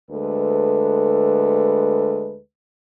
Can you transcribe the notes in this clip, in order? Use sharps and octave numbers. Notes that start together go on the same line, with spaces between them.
D2 G#3 A4 B4